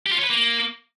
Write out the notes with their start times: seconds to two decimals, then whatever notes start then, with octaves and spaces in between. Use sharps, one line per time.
0.06 G4
0.12 F4
0.18 C#5
0.24 B4
0.30 A#3